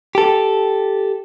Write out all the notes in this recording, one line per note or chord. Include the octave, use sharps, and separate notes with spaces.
G4 A4